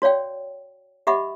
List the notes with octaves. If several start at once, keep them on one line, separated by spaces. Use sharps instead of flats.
F#4 C#5 D5 F5 G5
G4 D#5 E5 F#5 B5 D6